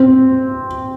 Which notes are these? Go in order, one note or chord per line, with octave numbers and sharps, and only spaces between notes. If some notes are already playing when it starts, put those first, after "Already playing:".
Already playing: C4